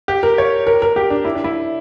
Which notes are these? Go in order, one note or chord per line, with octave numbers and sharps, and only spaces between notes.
G4
A#4
C#5
A#4
A#4
G4
D4
E4
D4
E4